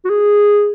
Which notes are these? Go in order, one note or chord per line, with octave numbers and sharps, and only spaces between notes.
F#4
G#4